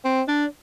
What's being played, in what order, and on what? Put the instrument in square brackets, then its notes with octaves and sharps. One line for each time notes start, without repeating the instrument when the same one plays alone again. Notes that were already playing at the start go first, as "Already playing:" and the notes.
[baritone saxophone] C4
D4